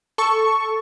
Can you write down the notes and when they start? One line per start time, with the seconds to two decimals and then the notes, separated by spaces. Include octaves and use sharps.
0.18 A4 C#6